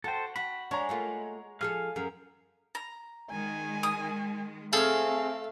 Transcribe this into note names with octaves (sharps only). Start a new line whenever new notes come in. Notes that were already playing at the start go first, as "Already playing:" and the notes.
F#4 A4 C5 G5 A5
F#4 B5
G#3 D4 C#5 A#5
A3 A#3 F4
F3 G#4 A4 F5 G#5 F6
F#2 G#4
A#5
D#3 G#3 G#5
D#6
A3 C4 G#4 A4 F5 F6